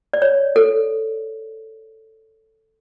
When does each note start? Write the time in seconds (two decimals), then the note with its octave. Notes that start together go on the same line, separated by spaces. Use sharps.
0.13 D5
0.22 C#5
0.56 A4